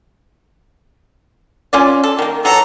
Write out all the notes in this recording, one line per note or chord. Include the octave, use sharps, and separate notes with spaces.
C#4 F4 D5
A4
D#3 A#3
E3 F#3 A4 A5 A#5